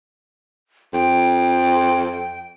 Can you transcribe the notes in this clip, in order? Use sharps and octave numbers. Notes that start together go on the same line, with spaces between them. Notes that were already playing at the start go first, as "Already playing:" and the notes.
F2 G5